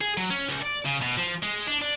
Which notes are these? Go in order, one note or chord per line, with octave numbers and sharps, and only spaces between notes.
G#4
F#3
C#4
C#2
D5
C#3
B2
F3
G#3
D4
D4